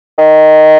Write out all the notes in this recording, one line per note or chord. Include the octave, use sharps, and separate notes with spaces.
D#3